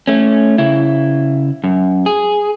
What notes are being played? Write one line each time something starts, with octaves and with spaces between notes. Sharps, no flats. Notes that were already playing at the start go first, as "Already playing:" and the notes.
A3 C#4
C#3 E4
F#2
G#4